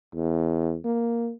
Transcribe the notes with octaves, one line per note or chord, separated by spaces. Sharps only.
E2
A#3